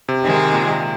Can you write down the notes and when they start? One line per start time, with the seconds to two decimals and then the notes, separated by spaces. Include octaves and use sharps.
0.09 C3
0.23 D#3 G#3 C4
0.52 A#2